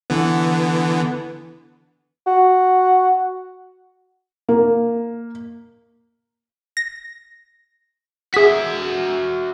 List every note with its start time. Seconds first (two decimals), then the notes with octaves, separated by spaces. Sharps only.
0.10 D3 E3 B3
2.27 F#4
4.49 A#3
6.77 A#6
8.34 F#4 G#4 E5 B6